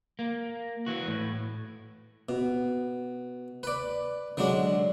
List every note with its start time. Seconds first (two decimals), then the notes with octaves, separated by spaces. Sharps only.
0.19 A#3
0.86 E3 F#4
1.07 A2
2.29 B2
3.63 B4 D5
4.37 D3 F#3 G#3 D4